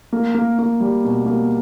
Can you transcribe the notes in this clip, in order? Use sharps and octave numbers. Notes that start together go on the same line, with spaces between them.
A#3
A#3
A#3
G3
B2
A#3